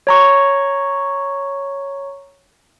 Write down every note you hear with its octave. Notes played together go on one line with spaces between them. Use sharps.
C#5 A#5 C#6